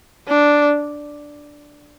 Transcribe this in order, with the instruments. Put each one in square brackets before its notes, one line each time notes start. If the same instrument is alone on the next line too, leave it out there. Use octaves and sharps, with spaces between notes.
[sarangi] D4